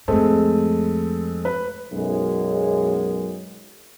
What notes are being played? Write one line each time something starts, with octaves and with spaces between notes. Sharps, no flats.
F2 A2 G#3 A3 C4
B4
B1 F#2 G#3